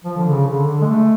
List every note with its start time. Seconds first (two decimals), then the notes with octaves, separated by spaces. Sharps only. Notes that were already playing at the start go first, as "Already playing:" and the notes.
0.04 F3
0.17 D3
0.30 C#3
0.48 D3
0.67 D3
0.81 G#3
0.85 A3